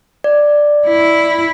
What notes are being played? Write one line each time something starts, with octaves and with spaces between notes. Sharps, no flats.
D5
E4